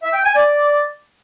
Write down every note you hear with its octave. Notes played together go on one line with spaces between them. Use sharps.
E5
G5
G#5
D5